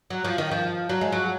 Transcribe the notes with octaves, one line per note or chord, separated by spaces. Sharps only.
F#3
F3
D#3
F3
F#3
G#3
F#3